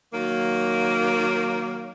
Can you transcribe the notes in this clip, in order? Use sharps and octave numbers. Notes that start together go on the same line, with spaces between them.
D#3 F#3 A#3